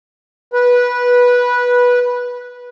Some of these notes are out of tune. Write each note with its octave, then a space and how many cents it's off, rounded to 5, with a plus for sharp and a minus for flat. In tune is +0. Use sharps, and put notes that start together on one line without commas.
B4 -15